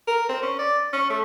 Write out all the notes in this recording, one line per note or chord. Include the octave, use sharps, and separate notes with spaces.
A#4
C4
C#4
D5
C#4
A3